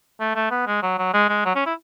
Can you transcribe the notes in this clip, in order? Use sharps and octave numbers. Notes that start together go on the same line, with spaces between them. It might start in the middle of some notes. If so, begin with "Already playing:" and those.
A3
A3
B3
G#3
F#3
F#3
G#3
G#3
F#3
C#4
E4